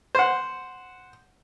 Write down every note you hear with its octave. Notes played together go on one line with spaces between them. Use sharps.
C5 F#5